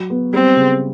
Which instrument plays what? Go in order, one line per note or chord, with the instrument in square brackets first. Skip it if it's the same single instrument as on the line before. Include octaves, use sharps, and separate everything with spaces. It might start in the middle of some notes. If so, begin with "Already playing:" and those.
Already playing: [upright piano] F#3
B3
[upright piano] G3 [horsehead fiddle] C4
[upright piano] C#3